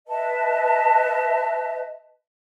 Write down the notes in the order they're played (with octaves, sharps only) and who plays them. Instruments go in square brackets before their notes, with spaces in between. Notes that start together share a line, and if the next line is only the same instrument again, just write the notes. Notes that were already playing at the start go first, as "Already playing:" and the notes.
[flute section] B4 D#5 E5 A5